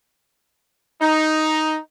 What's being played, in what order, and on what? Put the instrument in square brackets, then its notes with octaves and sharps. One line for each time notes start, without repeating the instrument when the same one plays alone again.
[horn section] D#4